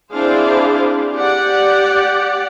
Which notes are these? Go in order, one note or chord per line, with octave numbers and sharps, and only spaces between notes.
C4 D4 E4 G#4 C5 F5
G4 D5 F#5